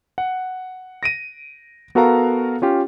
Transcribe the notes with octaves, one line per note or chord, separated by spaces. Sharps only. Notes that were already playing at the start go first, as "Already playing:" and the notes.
F#5
A#6 D7 D#7
B3 F#4 A4 A#4 F5 A#5
C#4 F4 G4